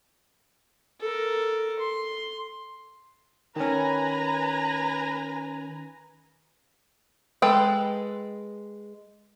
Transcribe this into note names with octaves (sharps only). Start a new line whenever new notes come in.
A4 A#4
C6
D#3 C#4 B4 G#5 A#5
G#3 A4 B4 G5